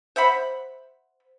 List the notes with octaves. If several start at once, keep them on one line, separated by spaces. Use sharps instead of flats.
C5 E5 F#5 B5